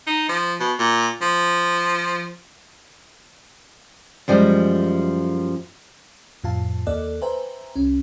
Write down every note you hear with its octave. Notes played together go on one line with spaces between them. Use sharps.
D#4
F3
B2
A#2
F3
F#2 F3 G3 G#3
F2 A2 F4 F5 A5
D#2 A#3 A4 D5 D#5 F#6
B4 C5 E5 G5 G#5 A#5
C2 C#4